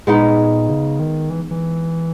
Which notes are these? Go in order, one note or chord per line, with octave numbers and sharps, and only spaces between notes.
A#2 G#3 B3 D#4
C#3
D#3
E3
E3